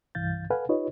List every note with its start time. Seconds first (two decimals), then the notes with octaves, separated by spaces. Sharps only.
0.15 C2 G2 E3 F5 G6 A6
0.50 A4 B4 F5 F#5 G#5
0.69 D#4 F4 G4 B4 C#5 D#5